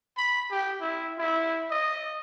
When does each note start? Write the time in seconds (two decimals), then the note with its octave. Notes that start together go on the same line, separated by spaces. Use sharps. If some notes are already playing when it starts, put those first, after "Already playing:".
0.17 B5
0.51 G4
0.80 E4
1.18 E4
1.71 D#5